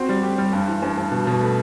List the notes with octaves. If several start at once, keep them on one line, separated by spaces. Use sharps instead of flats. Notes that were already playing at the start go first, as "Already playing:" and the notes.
Already playing: C4 F#4
G3
G4
G3
G2
E3
G2
G2
B2
B2
A3